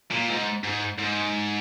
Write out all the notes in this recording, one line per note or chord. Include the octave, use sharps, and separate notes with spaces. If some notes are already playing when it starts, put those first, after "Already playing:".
A#2
G#2
G#2
G#2